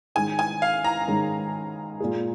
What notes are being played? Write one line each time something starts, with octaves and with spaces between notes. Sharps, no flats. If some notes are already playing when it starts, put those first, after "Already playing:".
G#2 D#3 G#3 C#4 G#5
G#5
F5
A#5
G#2 D#3 G#3 C#4
A#2 G#3 F4 G#4